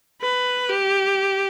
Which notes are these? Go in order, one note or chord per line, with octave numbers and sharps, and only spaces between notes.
B4
G4